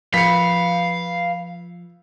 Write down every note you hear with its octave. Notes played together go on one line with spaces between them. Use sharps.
F3 B4 F5 B6 C#7